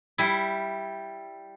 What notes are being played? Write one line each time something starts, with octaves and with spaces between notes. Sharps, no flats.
G3 E4